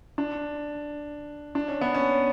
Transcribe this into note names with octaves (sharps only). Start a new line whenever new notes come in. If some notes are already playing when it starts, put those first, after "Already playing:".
D4
D4
C#4
B3
C#4